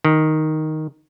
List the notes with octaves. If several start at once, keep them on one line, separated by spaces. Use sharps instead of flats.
D#3